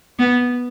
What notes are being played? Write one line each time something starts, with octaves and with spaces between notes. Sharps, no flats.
B3